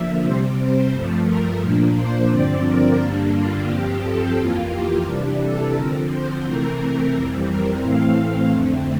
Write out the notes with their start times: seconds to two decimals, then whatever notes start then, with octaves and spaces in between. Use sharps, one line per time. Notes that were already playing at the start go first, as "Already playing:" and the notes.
Already playing: D3 F3 A#3 E5
0.23 C3 G3 C4 C5
0.59 C5
0.92 G2 F3 A3
1.27 A#4
1.61 A#2 F3 A#3 D4
1.96 C5
2.30 G2 D3 F3 C4 D5
2.65 A#4
2.99 G2 D3 G3 A#3 D4
3.34 F4
3.68 G2 F3 C4 G4
4.02 A4
4.37 F2 E3 A#3 F4
4.72 G4
5.05 C3 E3 G3 D4
5.41 A4
5.74 D3 F3 C4 A#4
6.10 C5
6.43 C3 E3 A3 C4 A#4
7.12 F2 E3 G3 C4 A#4
7.46 A#4
7.81 A2 E3 A3 C4 F5
8.50 F2 D3 A3 C4